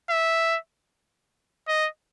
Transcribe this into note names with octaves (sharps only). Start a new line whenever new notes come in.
E5
D#5